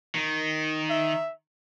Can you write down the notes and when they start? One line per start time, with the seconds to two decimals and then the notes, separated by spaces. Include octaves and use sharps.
0.15 D#3
0.90 E5